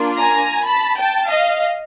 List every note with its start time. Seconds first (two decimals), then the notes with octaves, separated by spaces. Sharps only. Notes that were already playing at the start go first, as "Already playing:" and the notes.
Already playing: A#3 D4 F4
0.18 G#5 A#5
0.66 A5 B5
0.97 G5 A5
1.28 D#5 F5